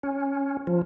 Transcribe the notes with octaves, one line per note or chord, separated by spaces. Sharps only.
C#4
F3